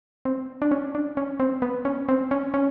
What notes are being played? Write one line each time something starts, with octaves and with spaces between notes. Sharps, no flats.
C4
D4
C#4
D4
C#4
C4
B3
C#4
C4
C#4
C#4